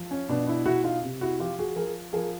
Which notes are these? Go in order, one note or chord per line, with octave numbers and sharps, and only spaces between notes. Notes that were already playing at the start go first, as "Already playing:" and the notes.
Already playing: F3
C#4
B2 D4
D4 E4
B2 E4 F#4
D#4 F4
C3
E4 F#4
F3 F4 G4
F#4 G#4
F3 G#4 A#4
F3 G#4 A#4